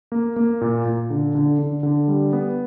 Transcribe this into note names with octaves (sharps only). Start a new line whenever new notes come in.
A#3
A#3
A#2
A#2
D3
D3
D3
D3
G3
B3